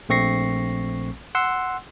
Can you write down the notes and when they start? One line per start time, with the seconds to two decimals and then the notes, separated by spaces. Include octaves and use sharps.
0.09 A#1 A3 C4 C#6 A#6 C7
1.35 F#5 C6 E6